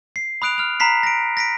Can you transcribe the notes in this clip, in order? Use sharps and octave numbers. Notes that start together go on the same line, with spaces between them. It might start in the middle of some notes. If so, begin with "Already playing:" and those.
C7
B5 D#6 F#6 D7 F7
F6 F7
A#5 B5 B6 C7
A#6 D7
A#6 B6 D7